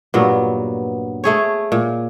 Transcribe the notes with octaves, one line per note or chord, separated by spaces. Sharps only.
G2 A#2 F#3 B3
A3 G#4 C#5
A#2